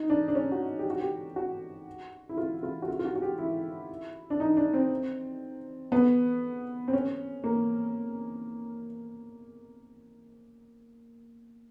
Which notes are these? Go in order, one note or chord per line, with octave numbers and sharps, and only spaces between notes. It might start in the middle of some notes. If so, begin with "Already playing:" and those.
Already playing: D#4
D4
D4
C#4
F#4
G4
F#4
G4
F#4
E4
F4
F4
F#4
F4
F4
F#4
F#4
G4
E4
D4
D#4
D4
C4
B3
C4
C#4
A#3